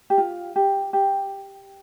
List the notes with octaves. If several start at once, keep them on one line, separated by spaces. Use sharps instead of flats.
G4
F4
G4
G4